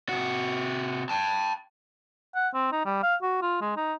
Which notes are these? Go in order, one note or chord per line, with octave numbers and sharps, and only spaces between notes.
C3 F#4
G5 A5
F#5
C4
D#4
G3
F5
F#4
F4
G#3
D#4